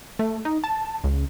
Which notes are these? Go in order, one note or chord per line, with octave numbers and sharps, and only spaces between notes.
A3
D#4
A5
C#2